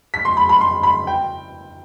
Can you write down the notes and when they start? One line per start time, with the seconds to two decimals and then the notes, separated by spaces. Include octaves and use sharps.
0.14 B6
0.25 C6
0.37 B5
0.49 B5
0.61 C6
0.83 B5
1.07 G5